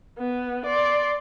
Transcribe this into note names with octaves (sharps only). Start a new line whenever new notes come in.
B3
D5 C6